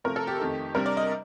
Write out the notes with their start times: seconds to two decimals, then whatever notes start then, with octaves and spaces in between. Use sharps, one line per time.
0.04 C3 F3 A3 A#4
0.16 A4
0.27 G4
0.39 F2 D#3 A3
0.75 C3 G3 D4 A#4
0.86 D5
0.97 D#5